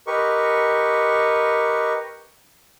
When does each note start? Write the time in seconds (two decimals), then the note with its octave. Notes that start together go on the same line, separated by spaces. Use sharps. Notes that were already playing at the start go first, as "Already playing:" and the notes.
0.07 G4 A#4 B4 D#5 C#6